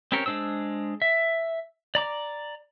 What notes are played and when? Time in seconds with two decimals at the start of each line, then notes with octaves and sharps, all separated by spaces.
0.12 C4 C#4 G4 A#4 C#5
0.26 G#3 D4 C5 E6
1.02 E5
1.95 D5 A#5 D6